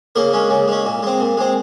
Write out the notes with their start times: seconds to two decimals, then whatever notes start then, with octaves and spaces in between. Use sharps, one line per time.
0.16 C#3 A#3 A#4
0.33 G#3 C#4
0.50 C#3
0.68 G#3 C#4
0.85 A#2
1.03 G#3 C4
1.20 A#2
1.37 G#3 C4